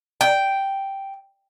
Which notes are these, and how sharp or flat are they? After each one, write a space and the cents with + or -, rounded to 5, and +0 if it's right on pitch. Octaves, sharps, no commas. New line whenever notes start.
G5 -5